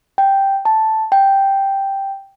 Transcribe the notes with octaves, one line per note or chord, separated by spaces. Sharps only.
G5
A5
G5